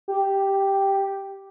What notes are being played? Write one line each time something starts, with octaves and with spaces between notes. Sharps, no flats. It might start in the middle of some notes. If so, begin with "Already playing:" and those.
G4